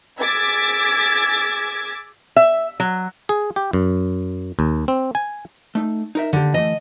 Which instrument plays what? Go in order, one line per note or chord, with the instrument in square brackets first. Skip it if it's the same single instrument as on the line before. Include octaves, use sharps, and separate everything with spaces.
[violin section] G#4 D6 E6 G#6 A6 B6
[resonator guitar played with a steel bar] E5
F#3
[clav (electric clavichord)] G#4
G4
F#2
D#2
C4
G#5
[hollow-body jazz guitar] A3 D#4
D#4 A#4 E5
[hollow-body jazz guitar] D#2 G4 [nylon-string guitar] D3
[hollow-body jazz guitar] E3 A3 [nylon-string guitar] D#5